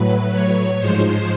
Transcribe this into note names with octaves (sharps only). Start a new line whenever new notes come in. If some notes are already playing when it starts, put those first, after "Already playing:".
Already playing: A2 F#3 B4
C#5
G#2 F3 G#3 C5